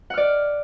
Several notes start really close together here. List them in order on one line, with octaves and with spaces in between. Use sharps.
F#5 F6 D5